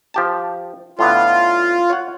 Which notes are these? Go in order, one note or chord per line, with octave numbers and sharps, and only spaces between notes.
F3 G4 A5
A2 D3 B3 F4
C#5 F#5